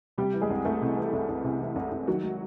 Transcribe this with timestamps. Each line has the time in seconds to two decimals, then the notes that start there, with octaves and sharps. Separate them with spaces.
0.18 C3 G3 G4
0.34 E3
0.42 G#3 G#4
0.50 C2
0.65 C2 A3 A4
0.82 C3
0.97 E3
1.13 C2
1.28 C2
1.44 C3
1.60 E3
1.76 C2
1.92 C2
2.07 D#3 F#3 F#4
2.23 G#3